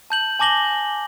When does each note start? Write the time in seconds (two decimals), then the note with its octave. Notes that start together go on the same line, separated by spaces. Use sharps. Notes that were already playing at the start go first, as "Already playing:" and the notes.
0.10 A5 G6 F#7
0.39 G#5 A5 D6 A#6 F#7 G7